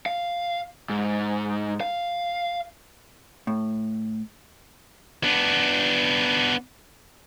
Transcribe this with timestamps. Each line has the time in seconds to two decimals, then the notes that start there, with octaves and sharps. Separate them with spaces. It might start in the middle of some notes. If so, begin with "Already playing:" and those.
0.06 F5
0.90 G#2
1.81 F5
3.47 A2
5.24 B3 D4